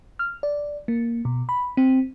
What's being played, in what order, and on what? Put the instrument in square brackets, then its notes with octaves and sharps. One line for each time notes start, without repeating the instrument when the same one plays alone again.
[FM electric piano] F6
D5
A#3
B2
B5
C4